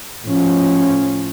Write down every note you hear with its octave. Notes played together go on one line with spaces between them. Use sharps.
A2 F3 C#4